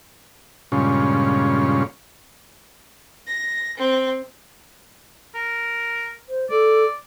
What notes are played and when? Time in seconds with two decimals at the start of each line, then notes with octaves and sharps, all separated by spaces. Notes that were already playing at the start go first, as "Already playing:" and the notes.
0.72 G2 A#2 C#3 G#3 C#4 F4
3.27 A#6
3.77 C4
5.35 A#4
6.29 C5
6.50 A4 D5